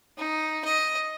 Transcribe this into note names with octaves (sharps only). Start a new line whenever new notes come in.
D#4
D#5